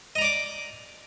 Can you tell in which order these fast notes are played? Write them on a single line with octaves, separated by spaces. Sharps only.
D#5 A#5 D5 D6